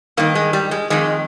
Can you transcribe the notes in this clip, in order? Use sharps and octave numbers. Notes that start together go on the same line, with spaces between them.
G2 D#3 A#3
G#3
G3
G#3
F2 D#3 G#3